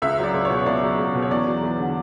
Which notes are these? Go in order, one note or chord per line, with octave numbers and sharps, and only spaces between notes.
C#2 E5
F#3
D5
C#2
C#5
B2
C#2 D5
F#3
C#2
B2
C#5
E2 D5
F#3
E2
D3